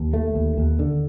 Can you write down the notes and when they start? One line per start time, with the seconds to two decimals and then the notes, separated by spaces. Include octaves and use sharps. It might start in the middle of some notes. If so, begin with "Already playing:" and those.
Already playing: D#2
0.13 A3
0.35 D#2
0.57 D#2
0.79 D3